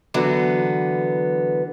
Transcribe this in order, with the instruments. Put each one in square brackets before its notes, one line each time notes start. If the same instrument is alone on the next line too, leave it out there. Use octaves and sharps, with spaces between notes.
[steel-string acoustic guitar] D3 E3 F#3 B3